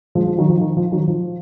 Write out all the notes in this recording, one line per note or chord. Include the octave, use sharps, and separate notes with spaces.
F3 G#3
F3
D#3 F#3
F3
D#3
F3
D#3 F#3
F3